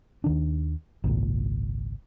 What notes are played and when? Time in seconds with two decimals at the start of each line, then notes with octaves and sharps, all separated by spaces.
0.24 D#2 D#3 D4
1.04 G#1 C#2 A#2